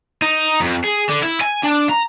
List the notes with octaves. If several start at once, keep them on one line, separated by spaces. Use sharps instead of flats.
D#4
F2
G#4
D3
E4
G#5
D4
A#5